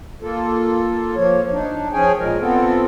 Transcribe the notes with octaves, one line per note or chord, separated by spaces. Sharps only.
A#3 F4 A4
F3 A#3 C#5
D4 D#4
F3 C#4 G#4 C#5 G5 G#5
A#2 G#3 A#4
B3 C4 F4 A4